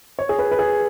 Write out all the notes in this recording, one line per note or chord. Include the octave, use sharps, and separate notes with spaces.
C#5
G#4
B4
B4
G#4